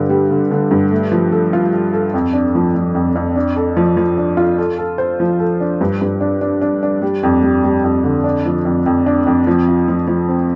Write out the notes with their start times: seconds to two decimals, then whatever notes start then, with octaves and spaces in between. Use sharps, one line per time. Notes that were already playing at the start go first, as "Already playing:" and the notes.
Already playing: G2 D3
0.09 G3
0.31 D3
0.51 D3
0.71 G2
0.91 A3
1.12 F3
1.32 A4
1.53 F4
1.73 A4
1.93 A4
2.14 F2
2.33 D4
2.55 F3
2.75 F3
2.95 F2
3.15 F2
3.36 D4
3.56 A4
3.77 F3
3.97 F3
4.18 D4
4.37 F4
4.58 A4
4.78 A4
4.98 C5
5.20 F3
5.40 A4
5.60 D4
5.81 G2
6.01 G2
6.21 D4
6.41 D4
6.62 D4
6.83 D4
7.02 G3
7.23 F2
7.43 G3
7.64 G3
7.84 F2
8.04 D3
8.24 D4
8.46 F3
8.65 F2
8.86 F2
9.06 D4
9.26 F2
9.47 F3
9.68 F4
9.88 F3
10.07 F3
10.29 C4